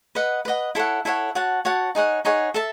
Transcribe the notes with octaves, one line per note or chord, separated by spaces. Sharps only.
B4 D#5 F#5
B4 D#5 F#5
E4 A4 C#5 F#5
E4 A4 C#5 F#5
F#4 C#5 F#5 A5
F#4 C#5 F#5 A5
D#4 G#4 C#5 F#5
D#4 G#4 C#5 F#5
A4 E5 A5